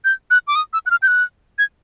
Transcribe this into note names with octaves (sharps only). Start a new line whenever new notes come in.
G6
F#6
D6
D#6
E6
F#6
F6
G6
F#6
G#6